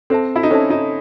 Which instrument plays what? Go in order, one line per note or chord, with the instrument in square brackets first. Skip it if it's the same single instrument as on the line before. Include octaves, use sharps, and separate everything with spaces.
[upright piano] C4 [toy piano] A4 C5 E5 A5
[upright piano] E4
D#4
[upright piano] C#4 [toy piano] A4 C5 E5 A5
[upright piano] D#4